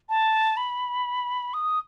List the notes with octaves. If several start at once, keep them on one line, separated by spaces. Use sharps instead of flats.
A5
B5
D#6